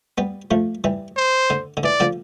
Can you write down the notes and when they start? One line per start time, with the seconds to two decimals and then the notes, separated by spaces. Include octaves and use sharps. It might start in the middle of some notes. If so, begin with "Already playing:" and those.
0.18 G3 B3
0.51 F3 A3
0.84 E3 G3
1.17 C5
1.50 D3
1.77 D3
1.83 E3 D5
2.00 D3 F3